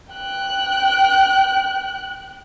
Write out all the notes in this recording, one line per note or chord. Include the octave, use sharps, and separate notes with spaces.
G5 F#6